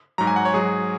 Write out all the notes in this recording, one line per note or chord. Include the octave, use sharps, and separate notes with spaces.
G#2 F#3 A#5
G#5
F#5
C#5
G#2 F#3 G#4